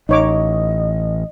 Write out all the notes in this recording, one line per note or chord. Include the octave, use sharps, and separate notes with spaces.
A1 D#4 C#5 D#5 D6